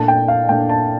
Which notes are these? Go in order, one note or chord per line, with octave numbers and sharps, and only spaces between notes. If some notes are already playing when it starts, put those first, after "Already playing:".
Already playing: A#2 A3 D4 A5
G5
F5
A#2 A3 D4 G5
A5